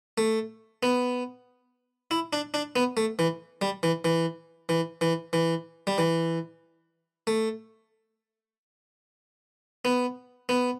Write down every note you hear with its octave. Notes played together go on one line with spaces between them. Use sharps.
A3
B3
E4
D4
D4
B3
A3
E3
G3
E3
E3
E3
E3
E3
G3
E3
A3
B3
B3